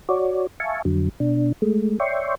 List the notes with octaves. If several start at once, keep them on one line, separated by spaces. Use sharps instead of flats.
F#4 C#5 D5
E5 F5 G#5 A5 C#6
F2 D3 F#3
B2 D4
G#3 A3
C#5 D5 E5 G5 C6 C#6